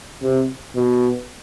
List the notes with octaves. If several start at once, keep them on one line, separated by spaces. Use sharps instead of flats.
C3
B2